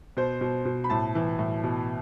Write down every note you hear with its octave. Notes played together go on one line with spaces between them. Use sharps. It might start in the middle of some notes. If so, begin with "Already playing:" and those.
B2 C5
B2
B2
B5
A2 A5
E3
A2
B2